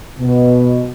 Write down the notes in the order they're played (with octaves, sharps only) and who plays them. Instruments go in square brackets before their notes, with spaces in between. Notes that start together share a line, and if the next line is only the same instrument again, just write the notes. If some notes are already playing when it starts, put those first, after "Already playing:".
[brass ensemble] B2